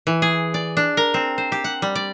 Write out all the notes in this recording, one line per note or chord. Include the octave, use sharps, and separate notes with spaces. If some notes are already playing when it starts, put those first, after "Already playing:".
E3
G#4
D5
D4
A#4
C4
C5
G4
F#5
G3
D5